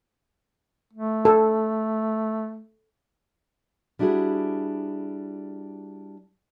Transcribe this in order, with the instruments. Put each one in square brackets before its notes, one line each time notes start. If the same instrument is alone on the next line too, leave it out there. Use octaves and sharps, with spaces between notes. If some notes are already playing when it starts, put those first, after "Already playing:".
[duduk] A3
[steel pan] A4
[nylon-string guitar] G3 D4 E4 F#4 G#4